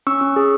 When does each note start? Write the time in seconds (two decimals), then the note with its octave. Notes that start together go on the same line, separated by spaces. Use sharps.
0.07 C#4 C#6 E6
0.21 C#4
0.36 G#4